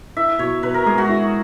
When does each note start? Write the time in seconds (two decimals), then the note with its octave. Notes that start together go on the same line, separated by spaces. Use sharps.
0.17 E4 E5
0.39 B2 C#5
0.63 B2 B4
0.74 A#4
0.86 G#3 G#4
0.98 F#4
1.09 E4